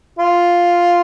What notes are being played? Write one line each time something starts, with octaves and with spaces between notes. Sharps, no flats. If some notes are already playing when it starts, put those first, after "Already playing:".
F4